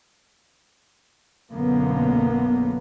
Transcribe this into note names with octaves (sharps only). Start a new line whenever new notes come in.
B1 F#2 D3 A#3 B3